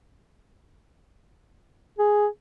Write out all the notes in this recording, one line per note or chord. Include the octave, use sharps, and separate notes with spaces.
G#4